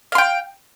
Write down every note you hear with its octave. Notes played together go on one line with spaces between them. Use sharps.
F5 G5 C6